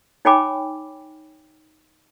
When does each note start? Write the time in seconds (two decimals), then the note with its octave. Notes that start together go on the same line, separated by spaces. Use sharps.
0.25 D#4 C#5 G5 G#5 B5 D6